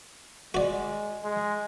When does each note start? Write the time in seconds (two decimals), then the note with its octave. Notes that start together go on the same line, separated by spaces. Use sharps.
0.54 G#3 F#4 D5
1.23 G#3